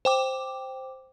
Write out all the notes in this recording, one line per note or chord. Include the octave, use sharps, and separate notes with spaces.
C5 G5 D6